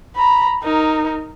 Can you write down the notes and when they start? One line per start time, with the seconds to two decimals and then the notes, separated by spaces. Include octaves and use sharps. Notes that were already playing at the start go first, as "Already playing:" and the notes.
0.16 A#5 B5
0.64 D#4 A#4